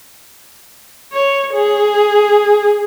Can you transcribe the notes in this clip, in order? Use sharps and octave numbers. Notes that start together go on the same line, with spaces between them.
C#5
G#4